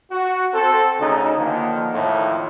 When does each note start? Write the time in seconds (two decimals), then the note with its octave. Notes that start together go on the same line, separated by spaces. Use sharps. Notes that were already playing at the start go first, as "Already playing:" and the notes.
0.12 F#4
0.53 C4 A4
1.00 D2 C#3 D#4
1.37 D3 D#3 F3 A#3
1.93 F2 A2 D#3 F3 A3